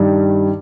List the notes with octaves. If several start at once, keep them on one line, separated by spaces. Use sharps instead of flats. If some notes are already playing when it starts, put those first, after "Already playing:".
Already playing: G2 D#3 G3